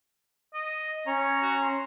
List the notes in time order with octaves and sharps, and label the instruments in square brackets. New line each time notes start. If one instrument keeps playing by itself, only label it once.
[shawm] D#5
[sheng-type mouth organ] C#4 A#5 [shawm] C#5
[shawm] F#4
C6